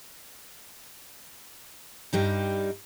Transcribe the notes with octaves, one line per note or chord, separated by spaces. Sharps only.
G2 G3 D#4